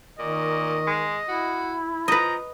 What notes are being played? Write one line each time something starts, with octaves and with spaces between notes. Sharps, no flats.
A#2 D#3 D#5
G#3
E4 F#4
F3 B4 D#5 A#5